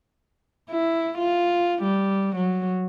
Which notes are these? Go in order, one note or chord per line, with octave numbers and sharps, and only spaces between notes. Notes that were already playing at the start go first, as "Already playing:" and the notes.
E4
F4
G3
F#3